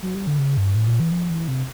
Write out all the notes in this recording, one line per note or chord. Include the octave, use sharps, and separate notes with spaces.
F#3
G3
D3
C#3
G2
A2
A#2
E3
F3
E3
C3